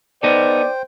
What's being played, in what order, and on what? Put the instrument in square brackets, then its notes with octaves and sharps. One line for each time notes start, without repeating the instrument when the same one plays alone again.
[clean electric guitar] B3 D#4 A4 [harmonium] C5 G5 [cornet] D5